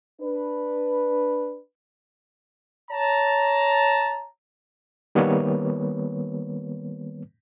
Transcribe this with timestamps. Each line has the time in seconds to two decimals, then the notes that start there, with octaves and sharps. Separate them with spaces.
0.21 D4 B4
2.91 C#5 A5 A#5
5.15 D#3 G3 A#3 B3 B4 C#5